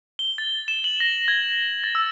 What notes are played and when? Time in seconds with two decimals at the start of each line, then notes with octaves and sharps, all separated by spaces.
0.19 G7
0.38 A6
0.68 E7
0.84 F#7
1.00 A#6
1.28 G#6
1.84 A6
1.95 E6